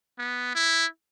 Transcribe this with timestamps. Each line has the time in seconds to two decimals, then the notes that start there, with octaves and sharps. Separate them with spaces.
0.19 B3
0.55 E4